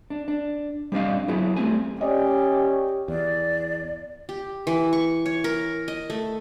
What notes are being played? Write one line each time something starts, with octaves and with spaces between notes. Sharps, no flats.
D4
D4
G3 C4 D4 D#5 F5
F#3 B3 E4 F#4 G#4
G3 A3 C4 G#5
C#4 G4 D5 D#5
E2 D5
G4
E3
C#6
C#5
A#4
D#5
A3